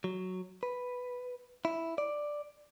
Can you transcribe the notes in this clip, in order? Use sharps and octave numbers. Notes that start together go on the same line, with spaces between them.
F#3
B4
E4
D5